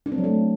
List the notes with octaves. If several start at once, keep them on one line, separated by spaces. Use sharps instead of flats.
D4
C4
F#3
A3